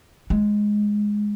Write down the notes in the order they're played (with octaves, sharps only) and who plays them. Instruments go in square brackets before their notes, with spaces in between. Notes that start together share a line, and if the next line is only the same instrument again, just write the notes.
[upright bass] G#3